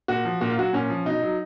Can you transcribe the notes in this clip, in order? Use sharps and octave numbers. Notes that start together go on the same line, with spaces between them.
A#2 F#4
F3
A#2 F#4
F4
F#3 F#4
A#2 C#4
F3
B2 D#4
F#3